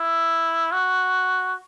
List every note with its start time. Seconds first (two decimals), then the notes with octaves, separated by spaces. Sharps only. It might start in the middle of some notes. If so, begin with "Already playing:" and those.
Already playing: E4
0.72 F#4